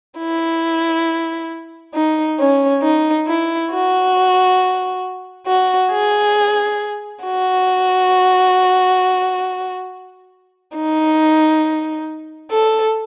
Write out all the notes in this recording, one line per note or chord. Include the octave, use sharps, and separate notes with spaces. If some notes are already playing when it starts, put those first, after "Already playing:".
E4
D#4
C#4
D#4
E4
F#4
F#4
G#4
F#4
D#4
A4